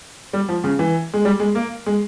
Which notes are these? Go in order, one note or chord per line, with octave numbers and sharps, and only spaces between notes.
G3
F3
C#3
E3
G#3
G3
G#3
A#3
G#3